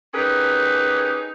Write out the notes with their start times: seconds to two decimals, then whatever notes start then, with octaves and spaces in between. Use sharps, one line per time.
0.14 C#4 D#4 G4 G#4 A#4 B4